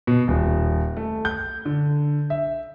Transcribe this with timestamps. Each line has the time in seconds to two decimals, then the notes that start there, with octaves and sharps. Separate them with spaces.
0.07 B2
0.28 D#1
0.97 A3
1.25 G6
1.65 D3
2.30 E5